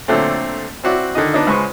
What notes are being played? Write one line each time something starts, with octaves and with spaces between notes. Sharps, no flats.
A#2 D3 F#3 A3 C4
C4 E4 F#4 D5
D3 D#3 D#5
B3 D4 D#4
C#2 G#3 B4 C5 C#6